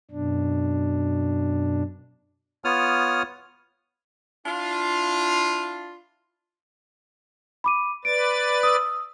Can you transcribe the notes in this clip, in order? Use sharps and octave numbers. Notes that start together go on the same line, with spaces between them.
F#2 B2 D4
B3 F4 C#5 D#6 F6
D4 E4 F4
B5 D6 D#7
B4 D5 A6 D7
D#6 E6